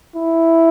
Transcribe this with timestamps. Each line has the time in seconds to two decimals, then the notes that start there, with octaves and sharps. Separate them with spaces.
0.16 E4